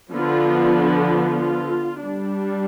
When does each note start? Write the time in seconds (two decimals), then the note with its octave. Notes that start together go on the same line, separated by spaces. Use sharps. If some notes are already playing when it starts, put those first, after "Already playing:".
0.13 D3 F3 B3 F4
1.08 F4
2.05 G3 D4